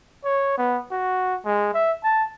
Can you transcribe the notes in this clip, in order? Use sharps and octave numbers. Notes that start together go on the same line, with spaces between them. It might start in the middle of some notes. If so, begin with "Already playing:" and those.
C#5
B3
F#4
G#3
E5
A5